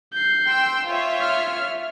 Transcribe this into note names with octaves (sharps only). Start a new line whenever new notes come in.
G6 C7
G5 C6 E6
F4 C#5 E5
F6